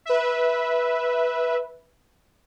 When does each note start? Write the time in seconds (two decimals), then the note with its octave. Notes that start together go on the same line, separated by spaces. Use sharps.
0.05 B4 E5